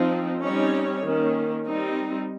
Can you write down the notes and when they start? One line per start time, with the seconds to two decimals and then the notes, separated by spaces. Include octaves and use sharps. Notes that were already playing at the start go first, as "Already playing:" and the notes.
Already playing: F3 C4 D#4
0.41 G3 C4 C#4 D#4 C#5
1.03 D#3 A#3 C#4
1.66 G3 C4 D#4